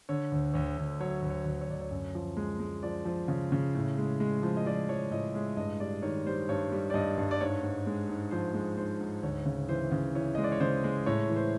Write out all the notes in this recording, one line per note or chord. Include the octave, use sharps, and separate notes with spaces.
D3 C#5
D2
D2 C#5
D2
F#3 C#5
D2
C#5
D2
C#5
D2 D5
C#5
F#2
F3
G#3
G#3
F3 D5
F3
C#3
C#3
A2
G#3
G#3
F3
D#5
F3 D5
F3 C#5
A2 D#5
G#3 E5
G2 D#5
G3 D5
D#3 C#5
G3 C5
G2 C#5
G3
D5
G2 D#5
G2
D5
G#2 C#5
G#2
G#3
G#2
F3 C5
G#3
G#2 C5
G#2
D2 C#5
C#3
E3 C5
C#3
E3 C#5
G#3 D#5
D5
C#5
C#3 C5
G#3
A2 C#5
E3
C5